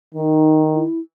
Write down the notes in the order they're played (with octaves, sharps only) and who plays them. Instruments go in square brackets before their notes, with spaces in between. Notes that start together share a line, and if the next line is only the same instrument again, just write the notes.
[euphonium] D#3 [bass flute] D#4
[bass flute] E4